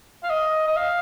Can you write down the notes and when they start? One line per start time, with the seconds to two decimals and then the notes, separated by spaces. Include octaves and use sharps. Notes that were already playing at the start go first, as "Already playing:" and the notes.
0.23 F5
0.30 D#5
0.67 D#5
0.77 F5